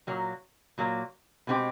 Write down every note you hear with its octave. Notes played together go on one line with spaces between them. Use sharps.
A#2 F#3 A#3
A#2 F#3 A#3
B2 G#3 C4 D#4 G4